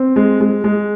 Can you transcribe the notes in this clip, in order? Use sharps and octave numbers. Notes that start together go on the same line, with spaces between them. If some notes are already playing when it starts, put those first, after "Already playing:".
Already playing: C4
G#3
G#3
G#3